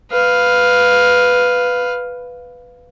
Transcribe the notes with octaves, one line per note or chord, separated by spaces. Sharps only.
B4 F5